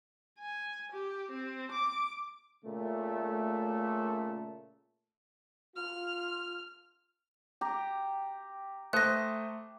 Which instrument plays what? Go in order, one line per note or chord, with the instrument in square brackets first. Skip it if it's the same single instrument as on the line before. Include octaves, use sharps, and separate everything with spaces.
[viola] G#5
G4
C4
D6
[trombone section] A#2 C#3 A3
[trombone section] F4 [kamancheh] F6
[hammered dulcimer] G4 A#5
[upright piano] A3 C5 D#6 [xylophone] F#6 A#6